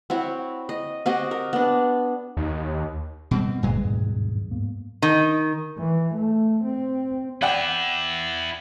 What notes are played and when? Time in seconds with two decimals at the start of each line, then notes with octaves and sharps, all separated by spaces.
0.10 C4 E4 F#4 C#5
0.69 D#5
1.06 C4 F#4 G4 D#5
1.31 A#4
1.53 B3 D4
2.37 D#2
3.31 B2 G3 C4
3.63 F#1 G2 A#2 C#3 F#3 G#3
3.82 D#2 G#2 B2
4.51 G#2 A#3 B3
5.02 D#3
5.79 E3
6.14 A3
6.64 C4
7.42 B3 E4 D5 F#5 G5